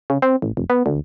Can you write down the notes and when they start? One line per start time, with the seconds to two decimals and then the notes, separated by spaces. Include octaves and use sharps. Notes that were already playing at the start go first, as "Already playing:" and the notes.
0.10 C#3
0.22 C4
0.42 A1
0.57 F1
0.70 B3
0.86 D2